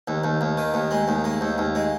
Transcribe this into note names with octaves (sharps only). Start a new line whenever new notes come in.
D#2
D#2
D#2
D#3
D#2
G#3
D#2
G#3
D#2
D#2
G#3